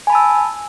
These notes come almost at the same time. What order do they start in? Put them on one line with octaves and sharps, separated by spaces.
G#5 B5 A5 E6